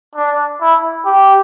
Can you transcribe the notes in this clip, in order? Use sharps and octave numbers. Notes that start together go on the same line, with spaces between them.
D4
E4
G4